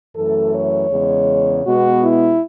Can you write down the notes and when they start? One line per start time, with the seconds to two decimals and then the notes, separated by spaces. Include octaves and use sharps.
0.15 F#2 E3 A3 A4
0.53 C#5
0.89 E2 C#3 G#3
1.64 B2 G#3 B3 F#4
2.02 E4